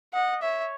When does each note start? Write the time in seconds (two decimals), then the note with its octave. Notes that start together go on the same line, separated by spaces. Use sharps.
0.14 D#5 F#5
0.42 C#5 E5